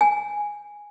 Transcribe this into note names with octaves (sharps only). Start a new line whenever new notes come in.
G#5